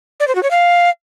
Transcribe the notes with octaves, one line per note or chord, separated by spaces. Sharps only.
D5
C5
F#4
C#5
F5